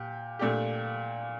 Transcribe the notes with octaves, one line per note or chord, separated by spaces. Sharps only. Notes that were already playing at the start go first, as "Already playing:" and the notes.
Already playing: A#2 G4
A#2 A3 D4 G4